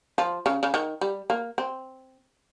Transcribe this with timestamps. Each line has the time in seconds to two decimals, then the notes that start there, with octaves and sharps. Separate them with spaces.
0.18 F3
0.46 C#3
0.63 C#3
0.74 D#3
1.01 G3
1.30 A#3
1.58 C4